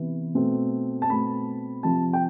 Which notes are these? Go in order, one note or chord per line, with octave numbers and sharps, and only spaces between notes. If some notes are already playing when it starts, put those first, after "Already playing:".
Already playing: C3 E3 B3
B2 A3 C4
A5
B2 A3 C4 B5
C3 F3 C4 A5
G5